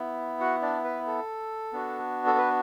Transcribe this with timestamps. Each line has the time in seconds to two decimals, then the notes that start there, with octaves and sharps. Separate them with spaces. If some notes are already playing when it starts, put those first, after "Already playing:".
Already playing: B3 E4
0.40 F#4 F#5
0.62 D4 D5
0.84 B4
1.07 A4
1.73 B3 D4 F#4
2.26 A4
2.38 B4